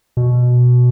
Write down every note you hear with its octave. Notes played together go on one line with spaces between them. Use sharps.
B2